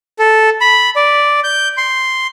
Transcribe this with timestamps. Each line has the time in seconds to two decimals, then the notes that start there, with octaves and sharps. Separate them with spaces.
0.19 A4
0.61 B5
0.96 D5
1.44 G6
1.77 C6